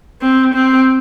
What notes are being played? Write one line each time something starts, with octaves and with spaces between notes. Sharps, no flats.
C4
C4